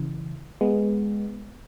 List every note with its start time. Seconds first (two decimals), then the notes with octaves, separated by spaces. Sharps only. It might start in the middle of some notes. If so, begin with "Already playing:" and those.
Already playing: C#3 E3
0.61 G#3 B3